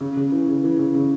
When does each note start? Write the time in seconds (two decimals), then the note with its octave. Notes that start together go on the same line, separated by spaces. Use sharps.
0.01 C#3
0.17 C#3
0.32 E3
0.48 C#3
0.64 E3
0.79 C#3
0.95 C#3